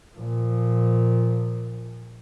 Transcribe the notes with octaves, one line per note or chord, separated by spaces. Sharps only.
A#2 F3